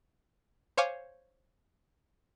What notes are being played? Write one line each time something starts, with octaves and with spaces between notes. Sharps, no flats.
C5 C#5 F5 G#5 D6